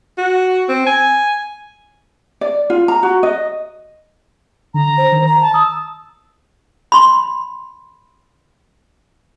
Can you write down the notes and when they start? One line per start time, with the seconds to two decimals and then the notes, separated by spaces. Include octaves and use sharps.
0.18 F#4
0.69 C4
0.86 G#5
2.41 D5
2.70 F4
2.88 A#5
3.03 F#4
3.23 D#5
4.74 D3 A#5
4.98 C5
5.12 D#3
5.27 A#5
5.41 A5
5.54 D#6 E6
6.92 B5 C6